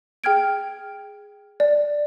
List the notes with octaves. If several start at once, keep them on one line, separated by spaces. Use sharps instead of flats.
G#4 G5 F6 G#6 D7
D5